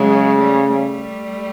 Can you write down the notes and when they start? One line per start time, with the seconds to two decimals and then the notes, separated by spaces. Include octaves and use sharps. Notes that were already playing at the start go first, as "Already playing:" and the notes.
Already playing: C#3 F#3 G#3
0.38 G3 A3
0.71 G3 A3